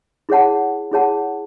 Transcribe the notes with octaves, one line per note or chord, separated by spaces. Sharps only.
E4 G#4 C#5 F#5 A5
E4 G#4 C#5 F#5 A5